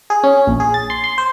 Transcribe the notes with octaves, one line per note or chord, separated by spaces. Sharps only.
G#4
C#4
A#1
G#4
A6
C6
C6
C5